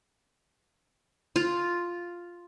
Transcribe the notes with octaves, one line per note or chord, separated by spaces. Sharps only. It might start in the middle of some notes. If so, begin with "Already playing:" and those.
F4